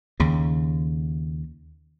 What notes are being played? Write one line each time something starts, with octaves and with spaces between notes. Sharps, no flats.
D#2 C#3